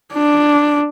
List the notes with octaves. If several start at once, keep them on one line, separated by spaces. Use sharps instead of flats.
D4